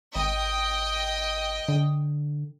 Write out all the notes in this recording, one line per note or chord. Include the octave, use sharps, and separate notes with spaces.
G#1 D#5 G5
D3